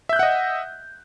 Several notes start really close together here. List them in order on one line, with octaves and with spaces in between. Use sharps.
E5 G6 F#6 F#5 D#5